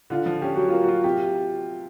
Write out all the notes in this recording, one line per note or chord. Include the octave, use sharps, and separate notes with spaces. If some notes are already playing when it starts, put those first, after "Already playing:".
D3 F4
F3
C#4 G4
F#3 F#4
A#3 F4
F#4
F4
C3 G4